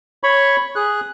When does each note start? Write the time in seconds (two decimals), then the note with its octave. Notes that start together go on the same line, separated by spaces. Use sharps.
0.23 C#5 B5 C#6
0.76 G#4 F#6